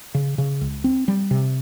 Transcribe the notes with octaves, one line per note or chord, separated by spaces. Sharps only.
C#3
C#3
C#2
C4
G3
C3